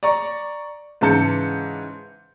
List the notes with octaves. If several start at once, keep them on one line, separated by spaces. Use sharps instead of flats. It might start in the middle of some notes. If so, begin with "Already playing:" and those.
D5 A#5 C#6
G#2 C#3 E3 A5 G6 C#7